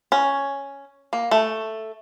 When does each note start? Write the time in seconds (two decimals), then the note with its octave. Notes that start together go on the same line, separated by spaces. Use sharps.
0.12 C#4
1.13 A#3
1.31 A3